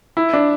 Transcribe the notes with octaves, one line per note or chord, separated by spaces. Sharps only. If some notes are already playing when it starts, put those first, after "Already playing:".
E4
D4